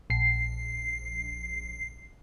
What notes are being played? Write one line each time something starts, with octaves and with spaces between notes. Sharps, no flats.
A#1 C7